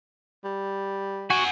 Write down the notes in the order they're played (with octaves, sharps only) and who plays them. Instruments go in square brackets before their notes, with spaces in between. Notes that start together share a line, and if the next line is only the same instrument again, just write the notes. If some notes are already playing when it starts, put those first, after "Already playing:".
[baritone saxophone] G3
[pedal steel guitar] F#4 [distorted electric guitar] F#5 G#5